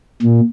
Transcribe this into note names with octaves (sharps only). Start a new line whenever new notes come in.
A#2